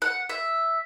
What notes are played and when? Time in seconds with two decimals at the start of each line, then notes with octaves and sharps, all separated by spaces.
0.02 F#5
0.29 E5